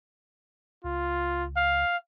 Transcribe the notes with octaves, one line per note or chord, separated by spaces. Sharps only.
C#2 F4
F5